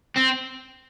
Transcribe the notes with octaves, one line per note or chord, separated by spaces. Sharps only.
C4